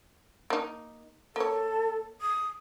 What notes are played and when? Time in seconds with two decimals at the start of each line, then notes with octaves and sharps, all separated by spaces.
0.50 A#3 D#4
1.36 A#3 A4 C#5
2.21 D#6